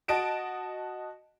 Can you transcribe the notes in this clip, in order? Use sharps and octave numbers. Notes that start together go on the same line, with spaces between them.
F#4 D#5 A5 D7 E7